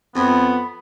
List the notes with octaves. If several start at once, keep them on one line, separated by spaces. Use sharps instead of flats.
F2 B3 B5